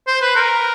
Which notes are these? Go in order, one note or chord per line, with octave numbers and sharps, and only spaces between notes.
C5
B4
A#4